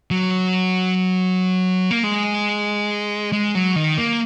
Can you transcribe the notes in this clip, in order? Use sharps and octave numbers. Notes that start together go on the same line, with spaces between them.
F#3
A#3
G#3
G#3
F#3
D#3
A#3